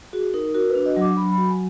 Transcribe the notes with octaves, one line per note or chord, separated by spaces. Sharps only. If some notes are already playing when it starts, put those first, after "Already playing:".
F#4 G#4
D#4 A#4
F#4 A#4
B4
D4
D#5
F#3 D6
F#3 B5
B5
F#4
G#5